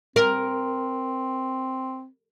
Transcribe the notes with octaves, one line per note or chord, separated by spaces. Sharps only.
C4 A#4